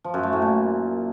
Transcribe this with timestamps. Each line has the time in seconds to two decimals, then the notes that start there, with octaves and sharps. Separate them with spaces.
0.04 F3
0.14 F#2
0.23 A3
0.33 A2
0.42 A#2